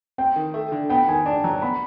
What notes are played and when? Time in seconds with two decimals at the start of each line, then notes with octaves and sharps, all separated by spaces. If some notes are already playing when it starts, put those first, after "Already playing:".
0.18 C4 G5
0.36 D#3
0.54 A3
0.72 D3
0.90 B3 G5
1.08 D#3 G#5
1.26 D4 A5
1.44 F#3 A#5
1.62 B3 B5